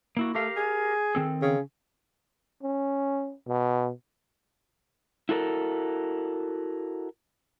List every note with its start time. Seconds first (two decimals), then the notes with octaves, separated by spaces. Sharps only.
0.17 A#3 E4 F#4
0.35 A3 G4 A#4 F5
0.56 G#4
1.15 D#3 C4 A4
1.42 C#3
2.63 C#4
3.48 B2
5.29 E4 F#4 A4 A#4